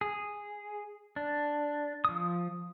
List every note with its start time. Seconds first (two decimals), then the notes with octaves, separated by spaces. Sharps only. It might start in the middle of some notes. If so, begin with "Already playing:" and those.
0.01 G#4
1.16 D4
2.05 F3 D#6